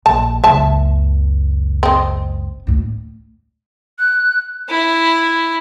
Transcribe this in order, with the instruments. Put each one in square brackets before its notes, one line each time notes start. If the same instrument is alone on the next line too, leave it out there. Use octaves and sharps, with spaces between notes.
[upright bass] A#1 [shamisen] A5
[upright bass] F#1 C#2 [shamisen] E5 A5
[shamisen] C4 D#5
[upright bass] D2 A2
[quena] F#6
[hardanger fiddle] E4